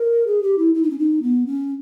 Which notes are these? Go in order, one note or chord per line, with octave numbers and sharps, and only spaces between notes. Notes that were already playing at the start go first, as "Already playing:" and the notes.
Already playing: A#4
G#4
G4
E4
E4
D#4
C#4
D#4
B3
C#4